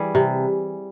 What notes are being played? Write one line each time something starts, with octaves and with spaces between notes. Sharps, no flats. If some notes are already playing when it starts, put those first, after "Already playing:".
Already playing: E3 G3 G#4
C3